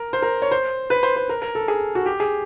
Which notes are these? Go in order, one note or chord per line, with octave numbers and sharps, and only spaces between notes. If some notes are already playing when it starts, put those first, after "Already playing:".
Already playing: A#4
C5
A#4
C#5
C5
B4
C5
C5
A#4
A#4
A4
G#4
F#4
G4
G#4